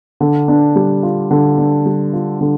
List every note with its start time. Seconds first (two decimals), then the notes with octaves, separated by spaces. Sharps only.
0.21 D3
0.48 D4
0.76 G3
1.03 F4
1.31 D3
1.58 D4
1.86 G3
2.13 F4
2.41 D3